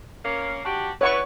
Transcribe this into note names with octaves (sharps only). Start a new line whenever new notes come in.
A#3 C#4
D4 F#4 G4
G3 E4 B4 C#5 F#5 C#6